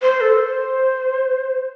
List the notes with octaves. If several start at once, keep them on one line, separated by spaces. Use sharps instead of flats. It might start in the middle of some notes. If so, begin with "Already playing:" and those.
C5
A4
C5